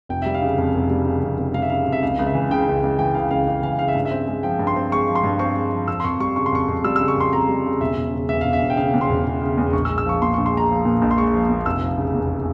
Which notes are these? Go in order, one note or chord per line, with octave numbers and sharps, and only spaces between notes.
F1 G5
G3 E5
F5
C#3
F2
F1
G3
C#3
F2
F1
G3 F5
E5
C#3 F5
F2
E5
C#2 F5
C#2
E5
E3
C#3 G5
C#2
C#2
E3 G5
C#3 F5
C#2 F5
C#2
E3 F5
C#3 F5
E5
G2
E5
C4
G#3
F3 G5
G2
C6
C4
G#3 C#6
F3
C6
G2
C4 C#6
G#3
F3
F2 E6
C6
F2 C#6
G3 C#6
C#3 C#6
C6
F2 C#6
F2
G3 E6
C#3 E6
C#6
F2 C6
F2 A#5
G3
C#3
E1 E5
E1
C#3
E2 E5
E1 F5
E5
E1
G5
C#3 F5
E2
C6
E1
E1
C#3
E2
A#1 C#6
E6
G#3
E6
F3 C#6
A#2 C6
A#1 C#6
C6
G#3 A#5
F3
A#2
A#1
C6
G#3 C#6
F3
A#2
F1 E6
F3
C#3
E2